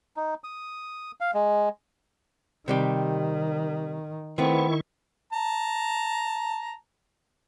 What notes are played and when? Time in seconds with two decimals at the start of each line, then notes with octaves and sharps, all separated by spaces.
0.17 D#4
0.44 D#6
1.21 F5
1.34 G#3
2.68 C3 D#3 G3 G4
4.38 D#3 A3 B3 C4 E4 C#6
5.33 A5 A#5